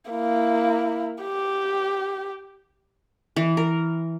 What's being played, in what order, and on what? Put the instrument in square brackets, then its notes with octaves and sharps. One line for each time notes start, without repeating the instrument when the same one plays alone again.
[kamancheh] A#3 E4
G4
[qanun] E3
A#4